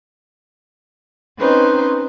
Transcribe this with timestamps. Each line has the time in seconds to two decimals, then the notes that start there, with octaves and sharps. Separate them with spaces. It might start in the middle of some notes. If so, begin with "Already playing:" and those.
1.39 C4 C#4 D#4 B4 C5